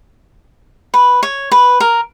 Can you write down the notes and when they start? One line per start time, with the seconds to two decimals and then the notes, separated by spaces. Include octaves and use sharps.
0.94 B4
1.23 C#5
1.52 B4
1.80 A#4